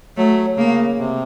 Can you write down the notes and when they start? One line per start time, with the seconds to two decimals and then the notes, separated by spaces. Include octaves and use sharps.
0.17 F#3 A3
0.57 C#3 A#3
0.99 C3